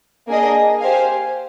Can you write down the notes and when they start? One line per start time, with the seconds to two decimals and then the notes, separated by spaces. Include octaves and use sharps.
0.28 A#3 D4 G#4 D#5
0.79 G4 C5 F5 G#5